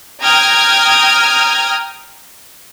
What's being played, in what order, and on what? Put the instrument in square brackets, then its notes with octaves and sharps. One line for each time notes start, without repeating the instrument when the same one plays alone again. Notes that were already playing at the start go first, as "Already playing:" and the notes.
[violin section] G5 A#5 D#6 F6 G#6